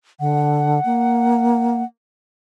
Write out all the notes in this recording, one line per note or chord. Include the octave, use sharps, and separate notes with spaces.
D3 F#5
A#3